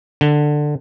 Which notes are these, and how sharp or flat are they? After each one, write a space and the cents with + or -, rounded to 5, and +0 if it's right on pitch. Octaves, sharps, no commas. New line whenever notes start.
D3 +15